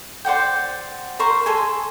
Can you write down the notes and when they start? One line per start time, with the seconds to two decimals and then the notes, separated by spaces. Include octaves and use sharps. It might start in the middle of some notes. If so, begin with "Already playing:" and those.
0.25 C5 D5 F#5 G5
1.19 A#4 C5 C#6
1.46 G#4 A4 G#5 C6